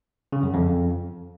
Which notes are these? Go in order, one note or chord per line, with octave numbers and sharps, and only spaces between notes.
C#3
F#2
F2